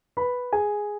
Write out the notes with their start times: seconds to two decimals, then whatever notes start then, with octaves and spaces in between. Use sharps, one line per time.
0.17 B4 B5
0.52 G#4 G#5